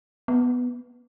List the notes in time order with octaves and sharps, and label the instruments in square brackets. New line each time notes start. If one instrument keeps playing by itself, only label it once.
[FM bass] B3